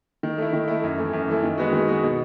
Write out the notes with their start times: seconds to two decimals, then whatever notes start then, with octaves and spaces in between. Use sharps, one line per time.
0.23 D#3
0.38 A3 E4
0.53 D#3
0.68 A3 E4
0.83 F#2
0.98 E3 A3
1.13 F#2
1.28 E3 A3
1.43 D#3
1.58 G#3 B3 F#4
1.73 D#3
1.88 G#3 B3 F#4
2.03 B2